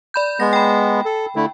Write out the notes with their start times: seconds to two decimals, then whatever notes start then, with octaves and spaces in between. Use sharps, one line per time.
0.14 D5 B5 G6
0.40 G#3 B3 A#6
0.53 G5 B5
1.05 A4
1.36 D3 A3 E4